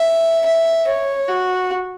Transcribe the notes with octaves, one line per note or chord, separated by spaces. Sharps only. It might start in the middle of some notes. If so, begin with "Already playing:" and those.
Already playing: E5
E5
C#5
F#4